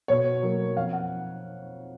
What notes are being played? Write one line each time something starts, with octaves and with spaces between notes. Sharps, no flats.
B2 C#5
F#3 A#3
F2 F5
F#5